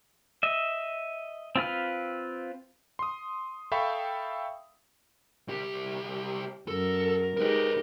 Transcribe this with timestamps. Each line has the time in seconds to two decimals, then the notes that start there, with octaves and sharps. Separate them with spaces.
0.43 D#5 E5
1.56 C4 F4 B4 F6
2.99 C6 D#6
3.72 A4 E5 F5 G5 B5 C#6
5.48 C2 G4
6.68 F#2 A4 A#4
7.37 G#3 D#4 G4 A#4 B4